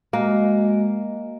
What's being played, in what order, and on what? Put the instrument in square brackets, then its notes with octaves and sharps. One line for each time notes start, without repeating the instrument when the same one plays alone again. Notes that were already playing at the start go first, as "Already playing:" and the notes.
[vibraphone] G#3 F#4 D#5 [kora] A#3